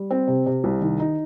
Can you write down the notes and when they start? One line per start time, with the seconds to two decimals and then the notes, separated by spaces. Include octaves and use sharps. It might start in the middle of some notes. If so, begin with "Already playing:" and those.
Already playing: G3
0.10 C4
0.28 C3
0.46 C3
0.64 C2
0.81 D#3
1.00 D#4